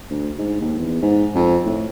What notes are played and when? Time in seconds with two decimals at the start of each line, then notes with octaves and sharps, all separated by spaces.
0.10 D2
0.39 G#2
0.61 D#2
0.79 E2
1.02 G#2
1.35 F2
1.65 A2